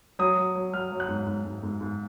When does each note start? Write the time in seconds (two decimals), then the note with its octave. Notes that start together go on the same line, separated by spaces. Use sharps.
0.19 F#3 D#6
0.38 F#3
0.55 F#3
0.74 F#3 F6
0.92 F#3
1.00 F#6
1.08 G#2
1.26 G#2
1.44 G#2
1.63 G#2
1.81 G#2